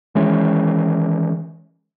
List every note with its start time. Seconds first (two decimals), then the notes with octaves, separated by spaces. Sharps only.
0.15 D#3 E3 G#3 C#4